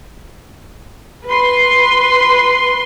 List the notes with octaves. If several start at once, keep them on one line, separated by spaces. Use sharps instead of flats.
B4 C6